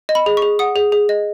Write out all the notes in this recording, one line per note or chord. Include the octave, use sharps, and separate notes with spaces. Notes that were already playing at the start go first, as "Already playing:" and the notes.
D#5
B5
G#4
C#6
G#4
F#5 D#6
G#4
G#4
D#5